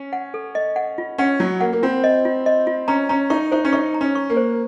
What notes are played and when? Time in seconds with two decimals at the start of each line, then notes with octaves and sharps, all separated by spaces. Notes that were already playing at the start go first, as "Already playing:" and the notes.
Already playing: C#4
0.13 F#5
0.34 A4
0.55 D#5
0.76 F#5
0.98 F4
1.18 C#4 F#5
1.40 F#3 F4
1.61 A#3 F#5
1.73 A#3
1.83 C4 F4
2.04 D#5
2.25 F4
2.46 D#5
2.67 F4
2.88 C#4 A#5
3.09 C#4 A#5
3.30 D#4 C#6
3.52 D#4 C5
3.65 C#4
3.73 D#4 C#6
3.94 A#5
4.01 C#4
4.15 C#6
4.30 A#3
4.37 C5